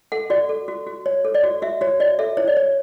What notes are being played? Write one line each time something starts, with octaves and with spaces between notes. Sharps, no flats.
A4 F#5
F#4 D5
A4
F#4
F#4
C#5
A4
D5
F#4
F#4 E5
F#4 C#5
F#4 D5
A4 E5
E4 C#5
D5
C#5